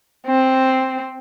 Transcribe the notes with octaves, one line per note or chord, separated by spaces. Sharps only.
C4